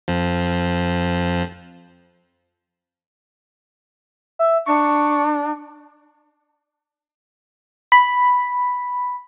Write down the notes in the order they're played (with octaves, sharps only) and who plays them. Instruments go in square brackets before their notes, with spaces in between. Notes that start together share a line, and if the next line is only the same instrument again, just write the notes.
[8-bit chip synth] F2 F3
[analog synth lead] E5
[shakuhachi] D4 [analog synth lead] C#6
[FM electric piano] B5